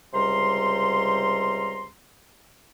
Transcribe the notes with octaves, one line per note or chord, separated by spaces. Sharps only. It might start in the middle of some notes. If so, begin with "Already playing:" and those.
C#2 C3 G3 A#5 C6